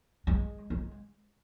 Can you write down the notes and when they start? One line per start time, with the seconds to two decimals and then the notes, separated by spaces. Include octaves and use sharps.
0.27 G#3
0.70 G#3